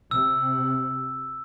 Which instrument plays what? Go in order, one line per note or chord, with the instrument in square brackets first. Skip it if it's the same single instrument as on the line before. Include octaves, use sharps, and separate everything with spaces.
[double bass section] C3 [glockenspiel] E6